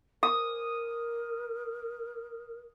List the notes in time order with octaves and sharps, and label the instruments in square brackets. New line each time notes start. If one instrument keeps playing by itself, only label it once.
[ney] A#4 [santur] D#6